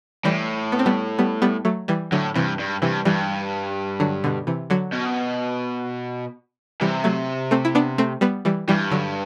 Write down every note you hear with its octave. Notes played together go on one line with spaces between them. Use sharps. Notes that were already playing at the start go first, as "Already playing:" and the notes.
A2 E3 G3
B3
C4
G3 B3
G3 B3
G3 B3
F#3 A3
E3 G3
A2 D3 F#3
G2 C3 E3
G2
G2 C3 E3
G2 E3 G3
D3 F#3
B2 D3
C3 E3
D3 F#3
B2
C3 E3 G3
F#3 A3
A3 C4
E4
B3 D4
A3 C4
G3 B3
E3 G3
G2 E3 G3
D3 F#3